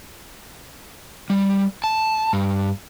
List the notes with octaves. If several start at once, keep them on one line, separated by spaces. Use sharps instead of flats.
G3
A5
G2